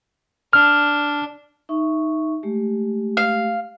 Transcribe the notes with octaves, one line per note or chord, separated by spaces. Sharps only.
D4 F6
D#4 E5 C#6
G#3 A3 G4
F5